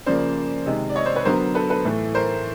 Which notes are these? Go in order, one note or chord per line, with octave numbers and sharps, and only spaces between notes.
C#3 F3 A#3 C5 D5
C3 D#3 G#3
D5
C#5 D#5
C5 D5
B4 C#5
D3 F#3 B3 A#4 C5
A4 B4
A4 B4
A2 E3 A3
A#4 C5